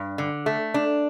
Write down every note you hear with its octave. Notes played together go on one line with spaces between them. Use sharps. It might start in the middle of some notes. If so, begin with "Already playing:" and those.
Already playing: G2
D3
A3
D4